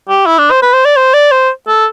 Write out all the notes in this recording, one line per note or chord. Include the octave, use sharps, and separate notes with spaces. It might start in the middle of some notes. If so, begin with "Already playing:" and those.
G4
E4
D4
C5
B4
C5
D5
C5
D5
C5
A4